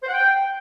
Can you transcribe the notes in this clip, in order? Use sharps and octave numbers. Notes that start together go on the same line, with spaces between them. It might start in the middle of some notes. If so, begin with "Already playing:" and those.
C5
F#5
G5